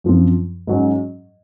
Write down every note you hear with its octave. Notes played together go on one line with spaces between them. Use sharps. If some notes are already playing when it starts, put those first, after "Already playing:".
F#2 F3 C4
G#2 F#3 C#4